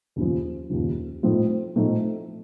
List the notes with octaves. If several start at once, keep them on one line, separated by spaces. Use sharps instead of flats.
D#2 C#3 F3
D#2 C#3 F3
A2 F3 A3 C4 D#4
A2 F3 A3 C4 D#4